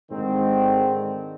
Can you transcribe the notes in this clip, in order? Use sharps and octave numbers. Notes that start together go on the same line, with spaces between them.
G#2 D3 D#3 C4